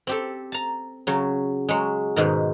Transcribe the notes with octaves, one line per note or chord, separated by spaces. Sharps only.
C4 G4 A4
A5 A#5
C#3 F#3
F#3 G#3
G#2 B2 D#3